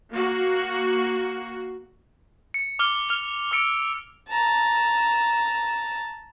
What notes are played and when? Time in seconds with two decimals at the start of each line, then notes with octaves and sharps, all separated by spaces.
0.12 A#3 F#4
2.54 C#7
2.79 D6 F6 G7
3.09 F6 F7 G7
3.51 D6 E6 C#7 D7
4.29 A5 A#5